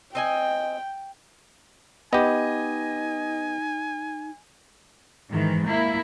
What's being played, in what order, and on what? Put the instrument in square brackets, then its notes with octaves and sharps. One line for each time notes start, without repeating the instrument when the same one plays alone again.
[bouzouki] C4 D#5 G#5 [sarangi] G5
[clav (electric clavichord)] B3 G4 [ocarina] D#4 [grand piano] D#5 [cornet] G#5
[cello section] G#2 D#3 E3
A#3 E4